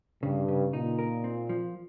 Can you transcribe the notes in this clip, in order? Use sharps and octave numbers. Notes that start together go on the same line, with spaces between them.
G2 C#3
C#3
A#2 D#4
A#4
C4
F3